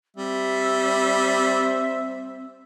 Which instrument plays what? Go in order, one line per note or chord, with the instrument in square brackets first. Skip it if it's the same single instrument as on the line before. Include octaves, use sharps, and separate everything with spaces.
[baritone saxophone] G3 [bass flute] C4 [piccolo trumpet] E5